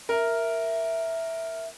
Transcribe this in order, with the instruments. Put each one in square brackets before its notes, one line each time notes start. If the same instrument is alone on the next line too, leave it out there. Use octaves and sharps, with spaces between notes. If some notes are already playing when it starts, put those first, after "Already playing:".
[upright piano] A#4 [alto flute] E5